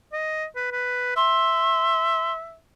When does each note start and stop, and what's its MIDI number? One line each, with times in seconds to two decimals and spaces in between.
0.13 0.45 75
0.56 0.71 71
0.72 1.16 71
1.16 2.57 76
1.16 2.32 84